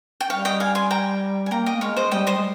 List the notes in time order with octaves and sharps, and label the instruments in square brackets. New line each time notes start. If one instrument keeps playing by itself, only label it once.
[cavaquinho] G5
[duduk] G3 [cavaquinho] C#5 F5
[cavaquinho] D#5 G5
F5 G#5
G#5 C6
G5 A#5
G#5
[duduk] A#3 [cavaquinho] G5 A#5
[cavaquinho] D#5 G5
[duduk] A#3
[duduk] G#3 [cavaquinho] C#5 F5
[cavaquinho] C5 D#5
[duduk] G3 [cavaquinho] D#5 G5
[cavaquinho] C5 D#5
[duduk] G#3